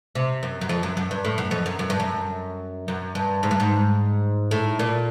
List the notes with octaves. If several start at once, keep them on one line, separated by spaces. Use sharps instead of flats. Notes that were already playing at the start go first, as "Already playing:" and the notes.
C3
F#2
F#2
F2
F#2
F#2
G2
A2
F#2
F2
F#2
F#2
G2
F#2
F#2
G2
G#2
G2
G#2
A2
A#2